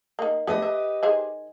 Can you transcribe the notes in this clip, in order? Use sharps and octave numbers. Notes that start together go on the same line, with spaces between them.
D#3 A#3
A3 B3 D4 G4 B4 D#5
E5
D#3 G#4 C5